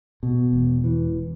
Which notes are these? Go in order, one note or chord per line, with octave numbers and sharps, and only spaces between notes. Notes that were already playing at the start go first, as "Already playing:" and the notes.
B2
E1
E3